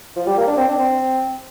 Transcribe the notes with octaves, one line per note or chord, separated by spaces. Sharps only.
F3
G3
A#3
D4
C4
D4
C4